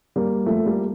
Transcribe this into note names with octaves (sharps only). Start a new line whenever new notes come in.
G3 A#3
F3 A3
G3 A#3